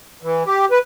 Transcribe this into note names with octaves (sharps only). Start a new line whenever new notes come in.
E3
G4
B4